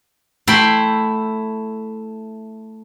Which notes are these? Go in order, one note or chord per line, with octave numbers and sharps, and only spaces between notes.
A3 E4 G5 B5 C6